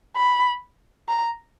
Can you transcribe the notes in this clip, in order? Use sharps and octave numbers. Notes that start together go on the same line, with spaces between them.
B5
A#5